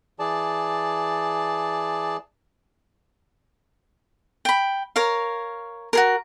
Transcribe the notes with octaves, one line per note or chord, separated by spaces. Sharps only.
E3 G#4 D5 A5
G5 B5
A#4 C#5 F5
F#4 G#4 A#4